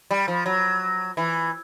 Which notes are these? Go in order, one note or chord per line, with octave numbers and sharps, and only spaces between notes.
G3
F3
F#3
E3